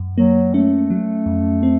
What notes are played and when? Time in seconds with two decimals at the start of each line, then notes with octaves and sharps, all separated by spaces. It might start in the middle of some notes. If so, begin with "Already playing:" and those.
Already playing: F#2
0.18 F#3 A#3
0.54 A3 C#4
0.90 F#3
1.26 F2
1.63 C4